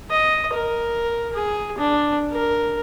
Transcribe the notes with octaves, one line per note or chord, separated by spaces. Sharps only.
D#5
A#4
G#4
D4
A#4